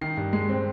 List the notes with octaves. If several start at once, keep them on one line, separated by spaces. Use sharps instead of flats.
D#3 C7
G2
G#3 C7
C4